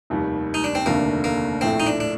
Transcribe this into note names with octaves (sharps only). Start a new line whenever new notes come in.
F1 D#2 D#3 G3
D#4
D4
C4
F1 D#2 D3 A3 A#3 D4
A#3
A#1 A2 A3 C4
D#4
D4
D4